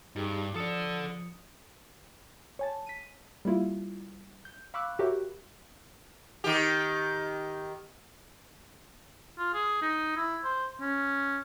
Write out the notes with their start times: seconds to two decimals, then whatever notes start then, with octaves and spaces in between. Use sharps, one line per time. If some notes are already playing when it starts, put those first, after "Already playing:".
0.16 G2 D#4 G4 G#4
0.55 F3 A4 D5 D#6 C#7
2.59 C#5 G#5 A5
2.86 B6 D#7
3.45 G3 A#3 E4 F4
4.45 G6
4.74 F5 B5 C#6 D6 E6 F#6
4.99 F#4 G4 A#4 C#5 E5 G5
6.44 D#3 G4
9.39 F4
9.54 G#4
9.82 D#4
10.16 E4
10.44 C5
10.81 C#4